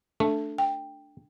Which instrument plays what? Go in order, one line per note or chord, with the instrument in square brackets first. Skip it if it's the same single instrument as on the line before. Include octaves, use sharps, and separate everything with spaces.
[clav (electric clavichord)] A3 [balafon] D4
[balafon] G5